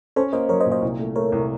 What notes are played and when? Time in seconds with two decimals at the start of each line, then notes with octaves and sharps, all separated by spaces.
0.16 C#4 A4 C5
0.33 A#3 C5 D#5
0.49 F#3 A#4 C#5
0.60 C5 D#5
0.66 A#2
0.71 C5 D#5
0.82 C2
1.00 A3
1.16 A3 A#4 C#5
1.32 C2